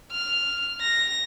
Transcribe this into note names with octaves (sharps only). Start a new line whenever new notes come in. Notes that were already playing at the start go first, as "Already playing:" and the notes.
F6
A#6